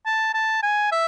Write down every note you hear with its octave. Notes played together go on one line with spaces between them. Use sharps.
A5
A5
G#5
E5